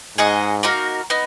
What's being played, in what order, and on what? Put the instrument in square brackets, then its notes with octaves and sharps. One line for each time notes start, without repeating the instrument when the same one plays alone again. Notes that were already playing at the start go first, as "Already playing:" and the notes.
[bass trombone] G#2 [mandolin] G#4 D#5 F#5
[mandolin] A#3 D#4 F#4 A#4
B3 D#4